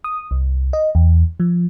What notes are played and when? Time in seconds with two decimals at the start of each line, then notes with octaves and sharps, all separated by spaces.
0.04 D#6
0.31 C2
0.73 D#5
0.95 E2
1.40 F3